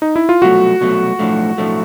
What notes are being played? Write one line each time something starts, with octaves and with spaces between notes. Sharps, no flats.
D#4
E4
F4
C2 B2 F#3 A3 F#4
C2 B2 F#3 A3
B1 A2 F3 A3 D4
B1 A2 F3 A3 D4